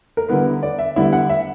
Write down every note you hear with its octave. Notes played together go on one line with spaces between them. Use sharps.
A#4
D3 G3 B3 E4 B4
D5
E5
D3 G3 B3 E4 E5
F#5
E5